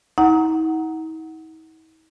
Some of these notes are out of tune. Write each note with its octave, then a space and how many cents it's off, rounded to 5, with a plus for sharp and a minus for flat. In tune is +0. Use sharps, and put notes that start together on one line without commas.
D#4 +45 F#5 +0 A#5 +0